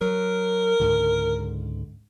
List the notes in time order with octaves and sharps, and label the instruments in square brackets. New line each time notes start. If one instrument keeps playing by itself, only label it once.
[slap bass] F#3 [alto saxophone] A#4
[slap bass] C#2 G#2 D3